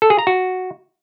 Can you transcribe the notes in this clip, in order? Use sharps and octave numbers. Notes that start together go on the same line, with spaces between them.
A4
G#4
A#5
F#4